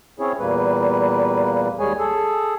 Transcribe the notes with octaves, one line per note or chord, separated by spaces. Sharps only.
C4 C#4 E4 G#4 C#5
E2 A#2 G3 A#3 B4
D#2 G3 G#3 G#4 C#5 G#5
G#4 A4